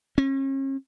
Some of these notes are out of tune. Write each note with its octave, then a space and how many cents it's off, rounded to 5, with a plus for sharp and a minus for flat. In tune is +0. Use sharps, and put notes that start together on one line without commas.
C#4 -40